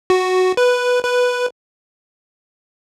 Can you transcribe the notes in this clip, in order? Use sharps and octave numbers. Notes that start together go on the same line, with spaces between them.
F#4
B4
B4